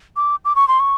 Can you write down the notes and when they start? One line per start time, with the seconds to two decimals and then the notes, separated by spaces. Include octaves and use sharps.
0.16 D6
0.45 D6
0.56 C#6
0.68 C6
0.80 C#6